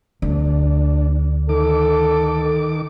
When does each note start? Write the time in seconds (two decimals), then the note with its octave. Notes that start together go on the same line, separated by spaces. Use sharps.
0.22 D2 D4
1.49 D#3 A4 D6